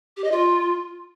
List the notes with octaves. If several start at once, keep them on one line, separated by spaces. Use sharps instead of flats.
G4
D#5
F4